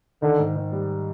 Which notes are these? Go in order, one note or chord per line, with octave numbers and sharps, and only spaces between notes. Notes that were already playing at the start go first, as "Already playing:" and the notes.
D3 D#3
G#2
D#3
G3